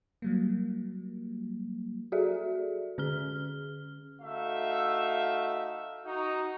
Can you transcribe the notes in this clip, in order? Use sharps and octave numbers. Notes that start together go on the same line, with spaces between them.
F#3 G3 A#3
F#4 G#4 A4 D5 E5
D3 C#4 G#4 F6 G7
A3 D#4 F#4 E5 F5
D#4 F#4